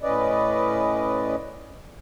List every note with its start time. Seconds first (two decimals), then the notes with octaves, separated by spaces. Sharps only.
0.02 A2 C#4 B4 D5 D#5